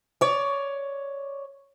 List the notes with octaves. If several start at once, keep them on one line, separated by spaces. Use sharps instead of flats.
C#5 D5